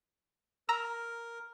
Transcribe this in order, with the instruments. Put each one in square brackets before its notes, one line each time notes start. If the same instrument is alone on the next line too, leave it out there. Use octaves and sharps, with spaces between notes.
[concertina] A#4 [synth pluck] A#5 E6